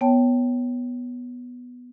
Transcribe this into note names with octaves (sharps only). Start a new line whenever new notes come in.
B3 C#5 G5 A5